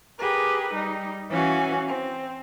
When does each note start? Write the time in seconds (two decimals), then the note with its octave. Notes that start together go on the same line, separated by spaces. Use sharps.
0.17 G4 G#4 A#4 B4
0.74 G3 D#4
1.29 E3 C#4 F#4 F5 G#5
1.87 C4